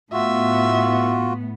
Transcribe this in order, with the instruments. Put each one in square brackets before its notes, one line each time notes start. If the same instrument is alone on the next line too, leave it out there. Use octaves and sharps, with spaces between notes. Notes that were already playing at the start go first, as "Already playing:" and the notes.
[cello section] A2 B3 [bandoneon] F4 F#4 [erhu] E5